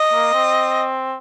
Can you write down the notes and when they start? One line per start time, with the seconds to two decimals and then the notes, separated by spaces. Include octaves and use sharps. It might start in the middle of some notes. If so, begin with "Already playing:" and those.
Already playing: D#5
0.13 A#3
0.33 C4